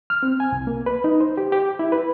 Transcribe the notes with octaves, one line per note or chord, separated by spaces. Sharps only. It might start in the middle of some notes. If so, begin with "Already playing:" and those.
F6
C4
G#5
C2
A#3
B4
D#4
C5
G4
G4
E4
B4